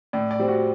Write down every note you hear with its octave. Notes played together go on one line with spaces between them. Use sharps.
A2 D5
D5
G3 C4
F#4